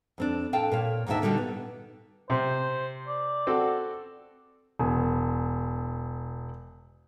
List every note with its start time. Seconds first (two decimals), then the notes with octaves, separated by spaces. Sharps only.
0.18 F2 C4 D4
0.53 A#2 A4 F5 G5 A5
0.72 A#2 C#5 F5
1.07 D2 G#2 D#3 A#3 D4 E5
1.22 A#2 D3 G3 D#4 F#4
1.38 B3
2.30 C3 C5
3.08 D5
3.47 C4 F#4 A4
4.79 E1 B3 G#5